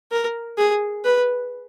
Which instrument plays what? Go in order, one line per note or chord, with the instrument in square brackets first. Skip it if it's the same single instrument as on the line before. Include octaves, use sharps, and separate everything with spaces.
[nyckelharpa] A#4
G#4
B4